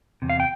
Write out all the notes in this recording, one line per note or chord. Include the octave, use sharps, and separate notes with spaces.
E2 C3
F5
G5